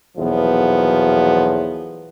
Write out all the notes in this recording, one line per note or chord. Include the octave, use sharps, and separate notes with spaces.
B1 E2 A#2 F3 F#3 B3